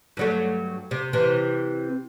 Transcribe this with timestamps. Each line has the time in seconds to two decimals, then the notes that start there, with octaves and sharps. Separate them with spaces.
0.17 G2 F#3 A3
0.91 C3
1.13 C3 E3